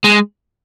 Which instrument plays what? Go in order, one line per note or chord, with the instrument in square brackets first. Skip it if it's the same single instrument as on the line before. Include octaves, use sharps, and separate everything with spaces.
[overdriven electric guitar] G#3